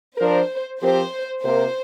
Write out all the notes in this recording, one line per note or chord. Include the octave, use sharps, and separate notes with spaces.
F3 D4 A#4 C5
F3 C4 G4 A#4 C5
C3 A#3 F4 A#4 C5